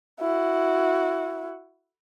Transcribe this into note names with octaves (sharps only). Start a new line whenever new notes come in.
E4 F#4